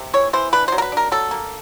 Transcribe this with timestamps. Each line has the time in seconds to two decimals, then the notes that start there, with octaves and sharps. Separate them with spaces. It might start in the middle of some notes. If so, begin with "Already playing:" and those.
Already playing: C3
0.14 E3 C#5
0.33 E3 C5
0.53 D4 B4
0.68 F#3 C5
0.78 A#4
0.82 B4
0.92 D4 A#4
1.12 F#3 A4
1.31 A#3